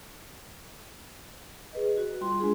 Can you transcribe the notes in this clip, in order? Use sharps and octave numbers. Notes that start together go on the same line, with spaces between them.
G#4 B4 D#5
F#4 B4
G3 F4 C6
G#3 D4 F4 G#4